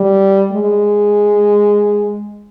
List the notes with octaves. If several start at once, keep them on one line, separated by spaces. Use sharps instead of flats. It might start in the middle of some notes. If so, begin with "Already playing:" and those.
Already playing: G3
G#3